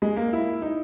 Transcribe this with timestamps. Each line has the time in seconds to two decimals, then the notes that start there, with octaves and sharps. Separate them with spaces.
0.02 G#3
0.16 A#3
0.33 E4
0.62 D#4